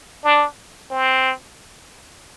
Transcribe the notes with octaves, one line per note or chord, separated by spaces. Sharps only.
D4
C4